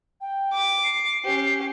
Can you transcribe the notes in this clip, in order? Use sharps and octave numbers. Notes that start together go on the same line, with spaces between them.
G5
D6
C7
C#4 G4